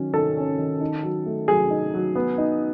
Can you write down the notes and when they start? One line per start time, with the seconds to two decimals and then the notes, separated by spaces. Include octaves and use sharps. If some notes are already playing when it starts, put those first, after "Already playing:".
Already playing: D#3 F#3 C#4
0.14 D#3 A4
0.37 C#4
0.58 D#3
0.81 D#4
1.03 F#3
1.26 A3
1.48 F#3 G#4
1.70 D#4
1.94 F#3
2.15 B3
2.38 D#4